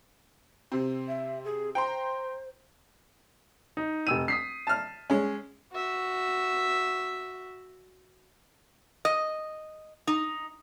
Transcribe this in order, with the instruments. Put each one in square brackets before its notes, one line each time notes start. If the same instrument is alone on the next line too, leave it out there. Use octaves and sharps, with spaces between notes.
[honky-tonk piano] C3 C4
[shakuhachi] E5
G#4
[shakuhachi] C5 [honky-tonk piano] G5 A#5 C6
[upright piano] D#4
F1 E6 D#7
D#6 B6 C7
[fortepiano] A5 F6
G#3 C#4
[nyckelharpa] F#4 E5
[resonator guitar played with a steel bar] D#5
D#4